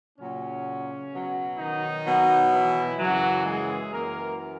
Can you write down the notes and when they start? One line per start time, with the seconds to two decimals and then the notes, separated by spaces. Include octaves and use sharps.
0.17 A#2 C#3 F#3 C#4
1.11 B2 F#3
1.58 D#3 D#4
2.06 B2 F#3
2.52 E3 E4
2.99 F#2 C#3 E3 F#3 F#4
3.46 G#3 G#4
3.93 F#2 E3 A#3 A#4